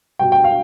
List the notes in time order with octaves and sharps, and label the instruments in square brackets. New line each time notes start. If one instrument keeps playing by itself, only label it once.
[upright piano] B2 G3 G5
G5
F5